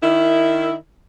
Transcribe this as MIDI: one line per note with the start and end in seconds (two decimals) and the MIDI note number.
0.03 0.74 51
0.03 0.74 64